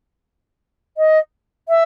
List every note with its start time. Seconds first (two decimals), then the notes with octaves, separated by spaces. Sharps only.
0.97 D#5
1.69 E5